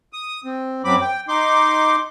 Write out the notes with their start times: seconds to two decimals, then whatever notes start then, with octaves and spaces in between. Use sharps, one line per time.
0.13 D#6
0.45 C4
0.85 F#2 F#3 C4 B5 D6
1.01 G5
1.28 D#4 C6 D6